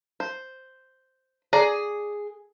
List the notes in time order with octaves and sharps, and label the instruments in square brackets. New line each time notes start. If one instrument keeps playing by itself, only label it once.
[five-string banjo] C5
[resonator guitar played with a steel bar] G#4 [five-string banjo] D5 A#5